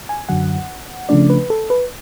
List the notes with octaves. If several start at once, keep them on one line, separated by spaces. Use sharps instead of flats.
G#5
F#2 D3 F#3 F#5
C#3 F3 A3 D4 D5
B4
A4
B4